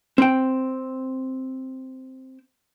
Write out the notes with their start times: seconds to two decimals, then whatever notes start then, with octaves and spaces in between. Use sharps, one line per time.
0.18 C4 G5